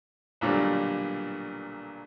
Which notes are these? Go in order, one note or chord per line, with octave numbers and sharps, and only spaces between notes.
B1 A#2 D3 F#3 G3